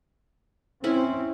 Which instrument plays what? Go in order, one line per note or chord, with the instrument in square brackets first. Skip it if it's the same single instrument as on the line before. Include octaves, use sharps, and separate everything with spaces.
[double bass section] C4 [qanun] C#4 E4 B5